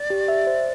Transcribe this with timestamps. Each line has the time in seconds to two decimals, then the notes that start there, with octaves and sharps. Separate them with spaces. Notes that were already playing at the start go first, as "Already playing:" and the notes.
Already playing: D5
0.10 G4
0.28 E5
0.47 C5